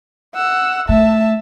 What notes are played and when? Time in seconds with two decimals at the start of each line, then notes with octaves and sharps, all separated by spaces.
0.35 F#5 E6
0.89 A3 E5 A5